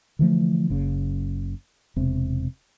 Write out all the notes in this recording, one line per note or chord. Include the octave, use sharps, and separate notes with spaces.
D3 E3 F3 A3
F#1 C#3
E1 C3